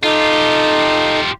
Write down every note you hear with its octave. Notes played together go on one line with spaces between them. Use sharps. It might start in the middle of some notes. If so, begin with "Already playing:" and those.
D#4 F4 G4 A4